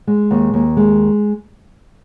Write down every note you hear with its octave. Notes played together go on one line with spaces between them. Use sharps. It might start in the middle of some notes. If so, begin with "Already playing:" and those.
G#3
D#2
D#2
G#3